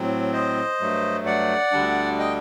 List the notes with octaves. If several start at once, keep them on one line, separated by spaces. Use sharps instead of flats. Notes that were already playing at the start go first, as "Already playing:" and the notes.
Already playing: A2 F#3 C4
C5 D#5
G2 F#3 A3
D5 F#5
D2 D3 G3 D4
D#5 G5